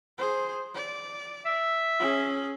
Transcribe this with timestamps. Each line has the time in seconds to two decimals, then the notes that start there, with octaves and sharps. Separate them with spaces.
0.18 G#4 C5
0.74 D5
1.45 E5
1.99 C#4 G#4